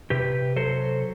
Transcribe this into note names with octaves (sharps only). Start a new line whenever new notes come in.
C3 G4 B4
F#3 A4 C5